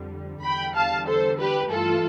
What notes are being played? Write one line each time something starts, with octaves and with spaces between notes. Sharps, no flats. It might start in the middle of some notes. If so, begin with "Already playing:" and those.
Already playing: F2 D3 G3
E2 D3 G3 G5 B5
F5 A5
A4 C5
G4 B4
G2 E3 A3 F4 A4